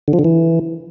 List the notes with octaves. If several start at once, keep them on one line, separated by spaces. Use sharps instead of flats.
D3
F3
D3
E3